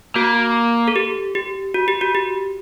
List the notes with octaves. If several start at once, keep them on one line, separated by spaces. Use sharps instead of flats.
A#3 F#4
A4
G4
G4
F#4
G4
F#4
G4